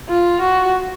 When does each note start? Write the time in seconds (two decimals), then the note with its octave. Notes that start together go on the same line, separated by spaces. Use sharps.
0.09 F4
0.41 F#4